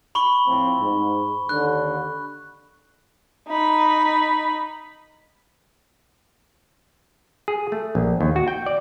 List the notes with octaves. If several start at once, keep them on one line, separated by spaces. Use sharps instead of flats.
B5 C#6 G7
A2 F3 C4
G#2
D#2 D3 F#6
D#4 B5
G#4
A3
A#1
D#2
F#4
G5
D5